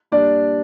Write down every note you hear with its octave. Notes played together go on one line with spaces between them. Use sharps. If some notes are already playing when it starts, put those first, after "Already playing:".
A#2 G3 D4 D5